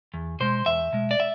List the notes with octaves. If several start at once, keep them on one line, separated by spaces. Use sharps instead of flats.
E2
B2 G#3 C5
E2 E5
B2 G#3
D5
E5